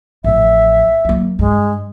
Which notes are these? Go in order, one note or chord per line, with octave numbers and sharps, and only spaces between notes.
A1 F3 E5
F#3 A#3
G2 G#3